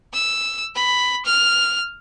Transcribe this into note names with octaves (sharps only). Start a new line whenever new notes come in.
E6
B5
F6